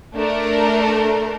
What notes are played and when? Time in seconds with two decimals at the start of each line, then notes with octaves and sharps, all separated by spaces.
0.17 A3 D4 A#4